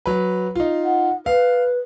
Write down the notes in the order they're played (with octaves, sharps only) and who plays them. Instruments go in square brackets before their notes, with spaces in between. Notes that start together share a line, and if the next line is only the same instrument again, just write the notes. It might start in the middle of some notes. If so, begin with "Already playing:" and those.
[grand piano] F#3 B4
D#4 F4
[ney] F#5
[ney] B4 [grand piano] F5